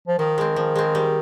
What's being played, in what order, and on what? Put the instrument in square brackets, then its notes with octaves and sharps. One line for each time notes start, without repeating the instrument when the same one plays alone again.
[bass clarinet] F3
[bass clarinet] D#3 [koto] F3
[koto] G#3 C4
F3
G#3 C4
G3